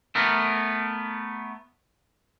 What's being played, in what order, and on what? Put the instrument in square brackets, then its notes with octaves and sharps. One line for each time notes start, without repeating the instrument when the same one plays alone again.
[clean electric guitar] A3 B3 A#4